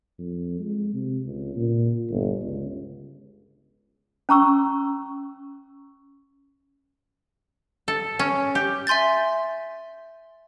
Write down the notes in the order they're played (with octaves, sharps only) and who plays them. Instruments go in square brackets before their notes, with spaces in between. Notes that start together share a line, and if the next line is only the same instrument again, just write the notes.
[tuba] F2
G#3
C3
C#2
A#2
G1
C#2
[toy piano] C#4 A#5 C#6 E6
[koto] A4
C#4
G4
[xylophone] E5 G#5 C6 G6 A6